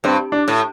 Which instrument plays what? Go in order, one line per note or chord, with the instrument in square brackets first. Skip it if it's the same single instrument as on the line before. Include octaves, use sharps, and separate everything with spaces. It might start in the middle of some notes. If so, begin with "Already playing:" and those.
[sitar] G2 [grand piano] C4
[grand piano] D4
[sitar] A2